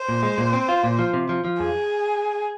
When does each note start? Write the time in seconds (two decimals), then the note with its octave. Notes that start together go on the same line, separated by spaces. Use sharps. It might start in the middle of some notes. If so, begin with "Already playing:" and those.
Already playing: C5
0.09 A#2
0.23 G#3
0.38 A#2
0.53 C4
0.69 F4
0.84 A#2
0.99 F3
1.14 C3
1.29 F3
1.45 F3
1.60 F2 G#4